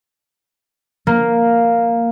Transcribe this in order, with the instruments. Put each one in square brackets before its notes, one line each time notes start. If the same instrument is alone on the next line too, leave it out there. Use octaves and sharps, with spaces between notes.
[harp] A#3